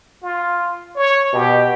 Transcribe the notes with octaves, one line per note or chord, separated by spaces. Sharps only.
F4
C#5
B2 G4